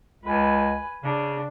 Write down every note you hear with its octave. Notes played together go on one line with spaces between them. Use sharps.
C#2 B4 G#5
C#3 D4